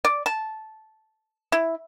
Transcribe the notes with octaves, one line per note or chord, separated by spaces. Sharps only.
D5
A5
E4